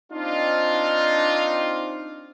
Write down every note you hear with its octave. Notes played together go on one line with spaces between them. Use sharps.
C4 D4 D#4 F4